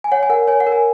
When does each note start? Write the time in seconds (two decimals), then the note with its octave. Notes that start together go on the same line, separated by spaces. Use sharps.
0.04 G#5
0.12 C#5 F#5
0.23 G#5
0.30 A#4 F#5
0.48 C#5 G#5
0.60 F#5
0.67 A#4
0.72 G#5